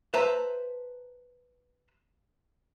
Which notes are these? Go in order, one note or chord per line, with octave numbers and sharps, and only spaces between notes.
B4 C5 E5 A5 A#5